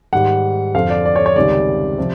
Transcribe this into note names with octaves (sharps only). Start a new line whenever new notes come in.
G#2 D#3 G3 F#5
F2 D3 F3 F5
D5
D5
C#5
C#5
C#2 C3 D#3 G3 D5
C3 F3